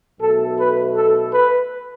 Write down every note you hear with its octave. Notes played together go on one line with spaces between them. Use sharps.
B1 B2 A3 A4
B4
A4
B4